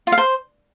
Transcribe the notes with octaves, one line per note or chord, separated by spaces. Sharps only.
F4
F5
C5